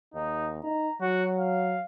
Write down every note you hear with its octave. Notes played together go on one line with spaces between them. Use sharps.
D#2 D#4
D#4 A#5
F#3 F#4
F5